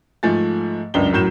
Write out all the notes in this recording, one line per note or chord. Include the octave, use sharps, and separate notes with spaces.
G#2 F3 A3 G#5 A6
C#2 F#2 D4 G7
F#2 A2 F#3 G6 E7